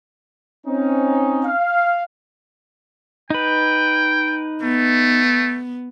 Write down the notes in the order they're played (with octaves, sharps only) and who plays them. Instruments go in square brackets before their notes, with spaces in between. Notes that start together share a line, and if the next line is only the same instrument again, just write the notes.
[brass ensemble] C4 C#4 D#4
[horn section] F5
[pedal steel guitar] D#4 B4 [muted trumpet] G5
[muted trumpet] A3 [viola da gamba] B3